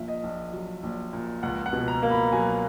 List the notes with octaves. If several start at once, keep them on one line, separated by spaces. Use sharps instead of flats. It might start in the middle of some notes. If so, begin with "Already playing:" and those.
Already playing: A#1 A#2 E5
D#5
A#1
F#3
A#1
A#2
C#2 F#5
F#5
B2
A#5
A#3
B5
F#3 G#5